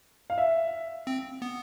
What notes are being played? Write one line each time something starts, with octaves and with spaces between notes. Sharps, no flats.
F5
E5
C4
B3